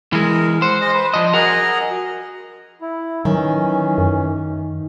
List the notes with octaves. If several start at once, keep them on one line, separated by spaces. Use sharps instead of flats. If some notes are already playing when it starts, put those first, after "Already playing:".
E3 G#3 A#4
C5 F#5
G#3 D#5
B4
F3 D4 D#5
F#4 G#4 A#4 D#5
E4
D#3 E3 F#3 C#4
F#2